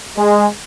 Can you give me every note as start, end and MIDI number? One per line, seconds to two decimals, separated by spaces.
0.17 0.47 56